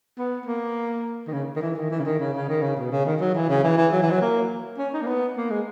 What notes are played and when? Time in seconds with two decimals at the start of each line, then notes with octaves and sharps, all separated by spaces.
0.18 B3
0.46 A#3
1.28 D#3
1.33 C#3
1.56 D#3
1.62 E3
1.76 D#3
1.91 E3
2.00 C#3
2.05 D#3
2.19 C#3
2.34 C#3
2.49 D#3
2.62 C#3
2.77 B2
2.92 C#3
3.06 D#3
3.21 F#3
3.35 E3
3.50 C#3
3.64 E3
3.77 E3
3.93 F#3
4.03 E3
4.11 F#3
4.21 A#3
4.78 C#4
4.94 D#4
5.02 A#3
5.07 B3
5.37 A#3
5.50 G#3